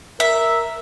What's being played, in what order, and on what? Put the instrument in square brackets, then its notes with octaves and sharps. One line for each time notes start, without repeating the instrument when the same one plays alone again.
[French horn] A#4 [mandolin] E5